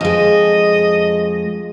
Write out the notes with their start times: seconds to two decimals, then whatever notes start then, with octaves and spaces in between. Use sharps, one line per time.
0.01 F2 G#3 D#5